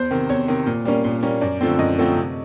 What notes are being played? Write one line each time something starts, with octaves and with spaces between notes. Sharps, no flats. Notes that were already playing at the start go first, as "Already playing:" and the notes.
Already playing: E2 C5
C3 D#3
E2 C#5
C3 D#3
A#2
G3 A#3 C#4
A#2
G3 A#3 C#4
F#2 D5
D3 F3 A3 C4
F#2 D#5
D3 F3 A3 C4
C3